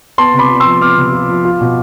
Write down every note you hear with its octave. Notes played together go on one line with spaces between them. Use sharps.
B3 A5 C6
C3
B5 D6
F4
F3 C6 E6
B3 D6 F6
C3
F4
F3
F4
B2